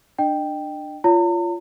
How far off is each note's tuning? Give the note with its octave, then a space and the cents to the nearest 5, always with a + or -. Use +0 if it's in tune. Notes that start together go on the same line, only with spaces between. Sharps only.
D4 +20 D#5 -20 G5 +0
F4 -15 C#5 +30 A#5 -45